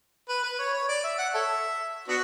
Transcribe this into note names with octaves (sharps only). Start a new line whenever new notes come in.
B4
B4
C#5
C#5
D5
E5
F#5
A4 C#5 E5
B3 D4 F#4